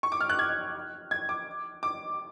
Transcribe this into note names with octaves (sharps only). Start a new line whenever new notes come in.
C#6
D6
F6
F#6
G#6
G#6
D6
D6